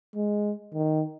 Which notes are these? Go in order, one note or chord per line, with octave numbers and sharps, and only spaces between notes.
G#3
D#3